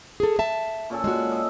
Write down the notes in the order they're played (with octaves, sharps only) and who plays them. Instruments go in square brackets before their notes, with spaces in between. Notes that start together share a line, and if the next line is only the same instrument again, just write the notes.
[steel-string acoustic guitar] G#4 A4
E5 A5
[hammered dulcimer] A#2 C#4 A4
[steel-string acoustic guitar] G#3 F#4
[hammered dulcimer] D#5 E5